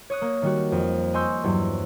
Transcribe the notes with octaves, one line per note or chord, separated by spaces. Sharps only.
C#5 D#6 F#6
A#3
D#3 G3 F#4
F2
D#5 G#5 C6 C#6 E6 G6
E2 G2 F#3